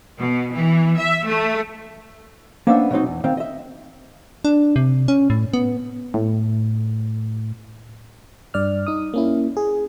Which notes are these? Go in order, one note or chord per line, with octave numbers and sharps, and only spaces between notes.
B2
E3
E5
A3
A#3 B3 C#4 D4 C5 E5
B2 F#3 C4 D#4
E2
D#3 C4 F5
D#5 E5
D4
C3
C#4
A2
B3
A2
G2 D5 F6
D#4 D#6
A#3 C#4 E4
G#4